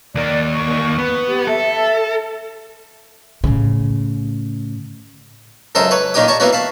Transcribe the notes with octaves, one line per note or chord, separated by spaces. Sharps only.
D#2 A#3 D5
C#6
B3
G4
A4 E5
A2 C#3
C#2 F#2 A4 A#4 C5 D#6
B4 C#5
A#2 D#3 C#4 D#4 G4 D#6
C#5 A5 A#5 C#6
E3 A#3 B3 C#4 F#4
F5 A5 B5